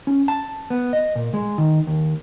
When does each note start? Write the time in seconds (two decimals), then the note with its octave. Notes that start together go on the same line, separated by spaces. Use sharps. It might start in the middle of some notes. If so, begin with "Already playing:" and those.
0.07 C#4
0.28 A5
0.70 B3
0.93 D#5
1.15 A#2
1.34 G#3
1.58 D#3
1.87 D#2